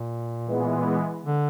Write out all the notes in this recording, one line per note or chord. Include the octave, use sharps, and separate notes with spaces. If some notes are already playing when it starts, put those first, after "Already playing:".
Already playing: A#2
E3 G#3 B3
D3